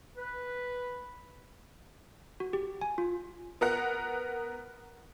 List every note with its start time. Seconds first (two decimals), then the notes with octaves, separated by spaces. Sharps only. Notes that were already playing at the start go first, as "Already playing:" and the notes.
0.17 B4
2.40 F#4
2.53 G4
2.81 G#5
2.98 F4
3.61 B3 A#4 F#5